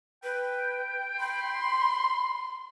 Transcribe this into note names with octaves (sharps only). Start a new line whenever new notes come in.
B4 G5
B5 C6